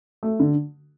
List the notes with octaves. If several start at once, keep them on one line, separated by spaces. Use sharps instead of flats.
A3
D3